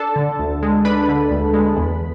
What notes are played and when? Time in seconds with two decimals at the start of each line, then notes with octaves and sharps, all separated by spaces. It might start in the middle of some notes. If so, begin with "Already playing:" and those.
Already playing: D4 A4 A5
0.16 D3
0.39 D2
0.63 G#3
0.85 D4 B4 B5
1.08 D3
1.31 D2
1.54 G#3
1.77 E2